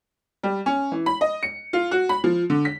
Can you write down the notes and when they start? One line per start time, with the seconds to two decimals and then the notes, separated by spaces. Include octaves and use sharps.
0.43 G3
0.66 C#4
0.92 E3
1.06 B5
1.21 D#5
1.43 C#7
1.73 F4
1.91 F#4
2.09 B5
2.24 F3
2.50 D3
2.65 B6